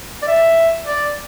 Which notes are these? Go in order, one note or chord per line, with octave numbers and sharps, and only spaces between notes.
D5
E5
D5